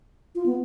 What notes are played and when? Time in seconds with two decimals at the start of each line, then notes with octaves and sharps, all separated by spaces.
0.35 F4
0.46 B3